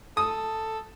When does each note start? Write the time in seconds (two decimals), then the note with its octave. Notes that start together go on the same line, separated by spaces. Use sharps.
0.17 A4 D#6